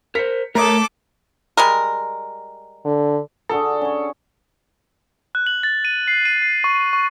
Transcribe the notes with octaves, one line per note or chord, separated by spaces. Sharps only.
A#4 C5 B6 C#7
A3 A4 A#4 C#5 A#5 D6 D#6
G3 G#3 A#4
D3
D3 F#4 G#4 A4
C#4 C#5
F#6
F#7
A6
D#7
C7
D#7
C7
C#6
C#6